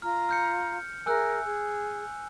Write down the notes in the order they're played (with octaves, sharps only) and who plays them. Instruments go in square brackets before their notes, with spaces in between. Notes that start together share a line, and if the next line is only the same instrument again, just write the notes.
[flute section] F4 A#5 [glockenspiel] F6
[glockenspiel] F6 G6 C#7
[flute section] G#4 A#4 E5 [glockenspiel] G#5 E6 F#6
[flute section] G#4